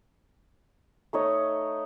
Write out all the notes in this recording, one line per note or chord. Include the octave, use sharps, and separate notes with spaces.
A3 D#4 C#5 D#5